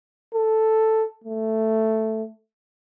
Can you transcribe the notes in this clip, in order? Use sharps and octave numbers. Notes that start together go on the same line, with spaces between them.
A4
A3